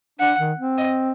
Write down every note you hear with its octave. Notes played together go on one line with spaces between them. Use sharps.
D4 F#5
D#3
C4
D#5